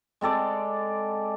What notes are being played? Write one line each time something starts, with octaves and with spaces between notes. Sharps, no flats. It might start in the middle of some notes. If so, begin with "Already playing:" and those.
G#3 C4 A4 D5